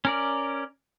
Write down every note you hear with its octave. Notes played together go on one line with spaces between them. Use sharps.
C#4 A#4 D5